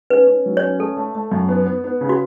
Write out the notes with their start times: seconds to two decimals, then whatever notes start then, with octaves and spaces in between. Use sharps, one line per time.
0.10 C#4 B4
0.27 C#4
0.46 F#3
0.57 C#5
0.63 C#4
0.79 A3 A4
0.97 A3
1.15 A3
1.31 F#2
1.49 B3
1.66 B3
1.84 B3
2.01 C#3
2.09 F#4